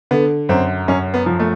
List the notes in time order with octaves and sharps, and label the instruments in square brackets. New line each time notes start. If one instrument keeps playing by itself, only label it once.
[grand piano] D3 [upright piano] B3
[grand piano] F#2 [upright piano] C4
[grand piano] F#2 [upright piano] C#4
[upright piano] B3
[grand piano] F3
[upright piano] A3